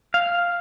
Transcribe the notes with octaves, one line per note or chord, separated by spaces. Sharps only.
F5